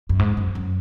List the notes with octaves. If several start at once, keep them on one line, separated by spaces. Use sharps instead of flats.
F#2
G#2
F#2
F#2